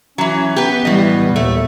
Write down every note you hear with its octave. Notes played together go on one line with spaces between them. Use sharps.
E3 F#3 C#4
B3 G4 B4
A2 E3 G3 D#5
D#2 A#2 A3